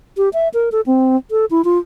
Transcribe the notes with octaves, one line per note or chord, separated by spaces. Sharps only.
G4
E5
A#4
A4
C4
A4
E4
F4